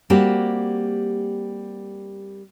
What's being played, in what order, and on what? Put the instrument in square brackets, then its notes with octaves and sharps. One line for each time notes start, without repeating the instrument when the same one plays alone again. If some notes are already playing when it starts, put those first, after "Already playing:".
[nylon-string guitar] G3 A#3 C4 F#4 G4